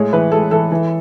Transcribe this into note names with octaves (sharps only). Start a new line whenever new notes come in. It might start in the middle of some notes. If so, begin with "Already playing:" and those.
Already playing: A2 G#3 C#5
E3 B4
G#3 A4
E3 A4
E3